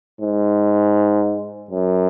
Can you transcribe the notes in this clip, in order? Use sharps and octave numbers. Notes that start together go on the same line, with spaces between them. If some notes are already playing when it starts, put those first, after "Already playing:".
G#2
F#2